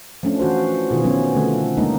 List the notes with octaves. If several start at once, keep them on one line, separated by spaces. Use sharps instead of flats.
F3 A3 C#4 D4
E3 F#4 C5
B2 D#3 F4 G#4
F3 F#3 B3 C#4
D3 A3 C4
F3 G#3 A#3 D4 D#4